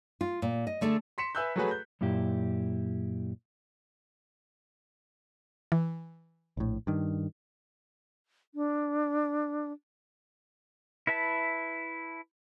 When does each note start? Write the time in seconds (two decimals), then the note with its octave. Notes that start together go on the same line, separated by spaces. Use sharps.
0.21 F4
0.42 A#2
0.67 D#5
0.81 D3 A3 G#4 A4
1.18 C6 B6 C#7 E7
1.35 B4 E5 G#5 E6 F#6 G6
1.56 F#3 A3 F#4 G#4 B4
1.71 G6
2.01 F#2 A#2 E4 G4
5.72 E3
6.57 A#1 A2
6.87 G2 D#3
8.55 D4
11.07 E4 B4 E5 A5 B5